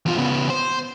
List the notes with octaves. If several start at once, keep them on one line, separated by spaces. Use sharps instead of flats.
E2 F4
C#3 B3
C5